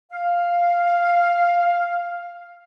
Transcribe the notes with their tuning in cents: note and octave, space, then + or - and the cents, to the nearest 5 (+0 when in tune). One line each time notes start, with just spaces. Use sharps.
F5 +0